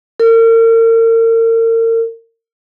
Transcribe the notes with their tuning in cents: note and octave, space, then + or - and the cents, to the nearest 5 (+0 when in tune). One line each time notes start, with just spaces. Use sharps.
A#4 -40